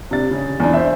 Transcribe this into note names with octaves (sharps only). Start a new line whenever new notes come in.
C3 D4 A6
C#3
E2 D4
C5 E5